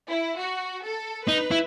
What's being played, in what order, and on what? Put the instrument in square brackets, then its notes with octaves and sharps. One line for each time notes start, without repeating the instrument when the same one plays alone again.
[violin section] E4
F#4
A4
[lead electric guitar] D#4 [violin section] B4
[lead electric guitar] E4